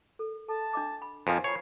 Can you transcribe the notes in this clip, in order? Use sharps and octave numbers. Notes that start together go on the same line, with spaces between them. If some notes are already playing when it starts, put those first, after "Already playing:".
A4 A#4
A4 A5
D4 D#5 D6
B5
F2 F3 A#4 C5 G#5
C#5 G#5 A#5 B5 C7